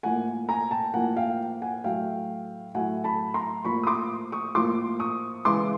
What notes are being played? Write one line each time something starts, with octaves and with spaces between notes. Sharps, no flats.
A2 F3 A#3 F#5 G#5
G#5 A#5
G5 A5
A2 F3 A#3 F#5 G#5
F5 G5
F#5 G#5
A2 F#3 A3 F5 G5
A2 F#3 A3 F#5 G#5
A5 B5
A#5 C6
A2 F3 A#3 B5 C#6
D#6
C6 D6
C#6 D#6
A2 F3 A#3 C6 D6
C#6 D#6
C#3 E3 G#3 C6 D6